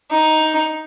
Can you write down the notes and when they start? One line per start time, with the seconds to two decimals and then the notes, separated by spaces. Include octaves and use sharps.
0.11 D#4